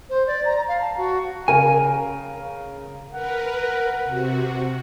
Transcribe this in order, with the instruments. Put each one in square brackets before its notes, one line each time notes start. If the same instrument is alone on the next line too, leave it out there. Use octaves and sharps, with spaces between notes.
[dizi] C5
D5
A#5
F5
A5
F#4
[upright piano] C#3 A#4 F5 [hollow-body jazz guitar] G#5
[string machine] A#4 B4 [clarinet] F#5
[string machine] C3 F#4